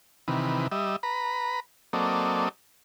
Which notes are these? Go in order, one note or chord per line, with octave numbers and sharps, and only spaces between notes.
C3 D#3 E3 B4
G3 D#5 E5
B4 A#5 B5
F#3 A#3 C4 A4 D5 D#5